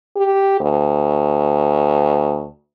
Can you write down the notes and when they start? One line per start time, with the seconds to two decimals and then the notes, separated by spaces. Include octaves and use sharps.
0.16 G4
0.60 D2